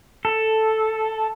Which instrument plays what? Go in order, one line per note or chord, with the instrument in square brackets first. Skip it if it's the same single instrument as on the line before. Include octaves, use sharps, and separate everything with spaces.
[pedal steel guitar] A4